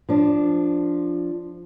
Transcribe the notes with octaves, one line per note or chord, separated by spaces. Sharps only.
F3 D4